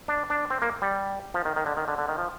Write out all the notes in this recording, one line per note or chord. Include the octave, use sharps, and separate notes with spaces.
D4
D4
C4
A#3
G3
F3
D#3
D#3
D3
D#3
D3
D3
D#3
F3